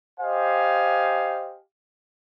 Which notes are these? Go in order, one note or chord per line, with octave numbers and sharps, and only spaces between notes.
G4 C5 D#5 F5 G#5